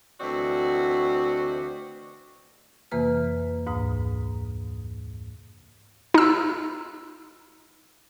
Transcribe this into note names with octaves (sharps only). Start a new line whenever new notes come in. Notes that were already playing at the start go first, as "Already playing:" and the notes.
D2 E3 C4 F#4 D5 D#5
F2 C3 E3 A#3 B4 F6
D2 G#2 A#5 D#6
D#4 E6